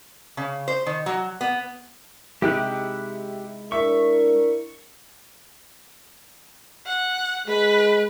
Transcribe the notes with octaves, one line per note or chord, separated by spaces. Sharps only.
C#3
C5
D#3
F#3
B3
C3 G#3 D#4 E4 G4 G5 F#6
D4 E4 A#4 E5 C#6
F#5
G#3 B4